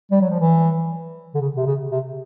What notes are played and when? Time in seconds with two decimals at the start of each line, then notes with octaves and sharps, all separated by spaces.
0.11 G3
0.21 F#3
0.30 F3
0.39 E3
1.34 D3
1.41 C#3
1.56 C3
1.66 C#3
1.92 C3